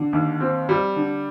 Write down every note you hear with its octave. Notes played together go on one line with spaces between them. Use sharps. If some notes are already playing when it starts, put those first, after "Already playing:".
Already playing: D3
D#2
C4
G3
D3